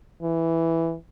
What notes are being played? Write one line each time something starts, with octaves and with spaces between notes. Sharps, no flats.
E3